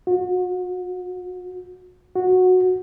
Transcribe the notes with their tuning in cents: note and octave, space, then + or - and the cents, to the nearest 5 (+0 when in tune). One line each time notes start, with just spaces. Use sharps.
F#4 -35
F#4 -10